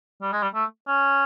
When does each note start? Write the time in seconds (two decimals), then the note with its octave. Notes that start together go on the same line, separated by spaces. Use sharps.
0.22 G3
0.32 G#3
0.42 G3
0.54 A3
0.87 C#4